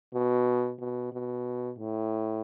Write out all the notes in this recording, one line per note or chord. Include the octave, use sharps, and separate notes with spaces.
B2
B2
B2
A2